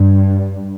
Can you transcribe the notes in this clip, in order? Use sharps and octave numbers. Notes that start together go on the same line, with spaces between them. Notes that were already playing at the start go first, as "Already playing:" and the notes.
Already playing: G2